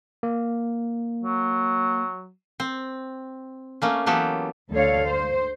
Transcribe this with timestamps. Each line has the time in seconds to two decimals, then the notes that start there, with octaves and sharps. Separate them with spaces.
0.23 A#3
1.23 F#3
2.60 C4
3.82 A3 A#3 C#4
4.06 E3 F#3 A#3 B3 G4 A4
4.71 D2 D3 A4 C#5 F5
5.06 C5